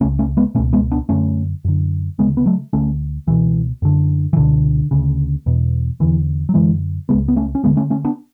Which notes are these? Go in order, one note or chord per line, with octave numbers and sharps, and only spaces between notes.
C#2 C#3 A3 C#4
A3 C#4
G#3 B3
C#2 B2 A3 C#4
G#3 B3
B3 D4
F#2 D3 A3 C#4
F#2 D3
D2 C#3 G#3 B3
B3
F#3 A3
D2 D3 A3 C#4
C#2 B2 E3
F#2 D3
E3
C#2 B2 D3
D2 C#3
E2 B2
E2 D3 E3
F#3
F#2 D3 E3 G#3
C#3 G#3 B3
C#2
B3
A3 C#4
C#4
D2 D3 G#3 B3
A3 C#4
A3 C#4
B3 D4